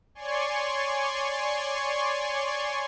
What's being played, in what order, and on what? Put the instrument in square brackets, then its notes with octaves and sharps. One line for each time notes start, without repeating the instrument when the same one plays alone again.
[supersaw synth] C#5 D5 G#5 C6 C#6